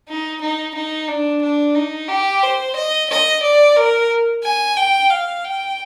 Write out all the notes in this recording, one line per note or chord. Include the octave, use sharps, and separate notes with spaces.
D#4
D#4
D#4
D4
D4
D#4
G4
C5
D#5
D#5
D5
A#4
G#5
G5
F5
G5